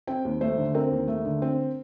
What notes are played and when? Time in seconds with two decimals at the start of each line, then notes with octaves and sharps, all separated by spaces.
0.07 C4 G5
0.25 D#2
0.41 A3 C5
0.58 D3
0.75 C4 A#4
0.92 D#2
1.08 A3
1.25 D3
1.42 C4